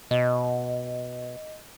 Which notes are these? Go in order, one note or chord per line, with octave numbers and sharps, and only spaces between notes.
B2 D#5